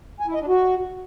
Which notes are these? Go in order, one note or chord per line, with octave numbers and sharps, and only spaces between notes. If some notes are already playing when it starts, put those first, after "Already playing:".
G#5
E4
D#5
D4
F#4